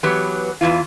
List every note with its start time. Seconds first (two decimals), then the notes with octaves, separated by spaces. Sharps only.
0.03 E3 F#3 B3 G4 B4
0.61 E2 G2 E3 F4